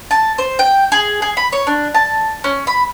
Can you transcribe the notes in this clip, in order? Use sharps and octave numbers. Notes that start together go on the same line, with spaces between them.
A5
C5
G5
G#4
G#4
B5
C#5
D4
A5
C#4
B5